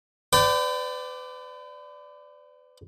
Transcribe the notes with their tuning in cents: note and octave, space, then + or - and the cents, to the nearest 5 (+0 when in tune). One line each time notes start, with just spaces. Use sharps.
B4 +40 D5 +0 G5 -15